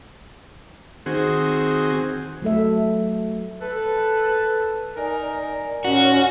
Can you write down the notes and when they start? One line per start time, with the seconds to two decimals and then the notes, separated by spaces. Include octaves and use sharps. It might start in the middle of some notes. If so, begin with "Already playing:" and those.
1.06 D#3 C4 F#4 G#4
2.42 F#3 A3 A4 E5
3.62 A4 B4
4.95 D#4 A#4 D5 G#5 A#5
5.85 D#2 A#2 C#4 F#4